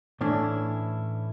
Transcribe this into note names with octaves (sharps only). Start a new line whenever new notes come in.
A2 E3 A3 C#4 D4 E4